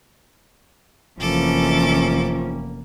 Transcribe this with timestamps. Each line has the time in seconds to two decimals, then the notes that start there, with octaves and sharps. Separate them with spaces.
1.20 F1 E3 F3 A#3 C#4 A4 D6